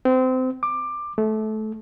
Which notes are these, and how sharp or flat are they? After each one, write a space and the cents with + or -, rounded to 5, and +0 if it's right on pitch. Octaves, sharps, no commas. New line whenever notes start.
C4 -25
D6 +15
A3 -20